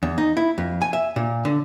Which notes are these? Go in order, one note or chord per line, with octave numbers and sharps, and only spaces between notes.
E2
D#4
E4
F2
G#5
E5
A#2
D3